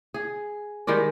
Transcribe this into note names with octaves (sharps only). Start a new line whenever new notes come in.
G#4
D#3 G3 G#3 D5